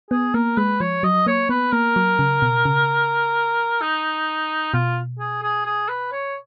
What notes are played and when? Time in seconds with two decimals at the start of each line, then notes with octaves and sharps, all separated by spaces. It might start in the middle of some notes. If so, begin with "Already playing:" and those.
0.10 B3 G#4
0.34 A#3 A#4
0.57 G#3 B4
0.80 F3 C#5
1.03 F#3 D#5
1.26 A#3 C#5
1.49 B3 B4
1.72 A#3 A#4
1.96 F#3
2.19 C#3
2.42 B2
2.65 C#3
3.81 D#4
4.74 B2 F4
5.19 G#4
5.43 G#4
5.66 G#4
5.89 B4
6.12 C#5